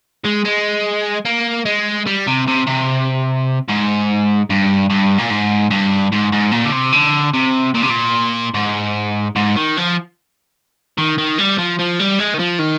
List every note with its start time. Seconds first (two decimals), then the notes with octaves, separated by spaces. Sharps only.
0.24 G#3
0.45 G#3
1.25 A#3
1.65 G#3
2.06 G3
2.27 C3
2.47 C3
2.67 C3
3.68 G#2
4.50 G2
4.90 G2
5.18 A#2
5.30 G#2
5.70 G2
6.12 G#2
6.32 G#2
6.52 A#2
6.65 D3
6.72 C3
6.92 D3
7.34 C3
7.74 A#2
7.82 C3
7.89 A#2
8.54 G#2
9.36 G#2
9.56 D#3
9.77 F3
10.98 D#3
11.18 D#3
11.39 G3
11.59 F3
11.79 F3
12.00 G3
12.19 G#3
12.34 D#3
12.40 F3
12.59 D#3